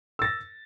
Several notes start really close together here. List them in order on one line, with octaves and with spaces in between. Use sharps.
E6 A6 A#6